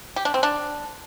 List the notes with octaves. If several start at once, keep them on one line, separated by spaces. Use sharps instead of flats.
G4
D4
C4
D4